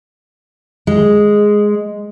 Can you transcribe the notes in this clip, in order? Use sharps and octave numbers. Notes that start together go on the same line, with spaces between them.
G#3